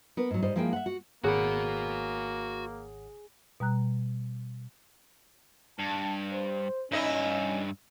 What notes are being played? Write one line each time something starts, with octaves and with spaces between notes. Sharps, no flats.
B3 A#4 B4
G#2 F#3
G#2 G3 C5 D#5
F3 G#3 A#3 E4 F#5 G5
E5 F#5
F#4
G#1 A#3 F#4 G#4 C#5 F#5 B5
B2 G3 A#5 F#6
G2 A5
C5
G2 C#4 D#4 E4 D#5 E5